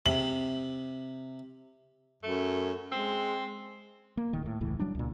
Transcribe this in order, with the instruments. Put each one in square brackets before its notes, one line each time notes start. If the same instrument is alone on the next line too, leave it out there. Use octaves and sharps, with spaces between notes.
[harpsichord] C3 [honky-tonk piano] F#7
[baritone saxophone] F#2 [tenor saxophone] A3
[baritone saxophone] G#3 [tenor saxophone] C4
[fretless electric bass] A#3
D1 D#3
A2
E1 C#2 A2 E3
F#3 G3 D4
C#2 A#2